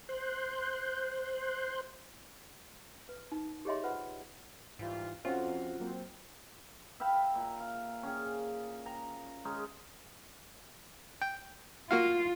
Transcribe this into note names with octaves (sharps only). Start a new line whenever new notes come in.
C5 C6 F#6 G6
B4
D#4
G4 G#4 C#5 D#5 E5 C6
F4 B4 C5 F#5
G#2 E3 G3 F4
F2 C4 C#4 F4 F#4 C5 F5
F#3 A#3 C4
E5 F5 G5 B5
A#2
F5
C#4 G#4
A#5
G#3 C#4 D#4
G5
A#3 F4 F#4 F5